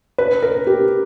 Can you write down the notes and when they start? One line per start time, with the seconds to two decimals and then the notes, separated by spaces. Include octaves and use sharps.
0.18 B4
0.42 A#4
0.67 G4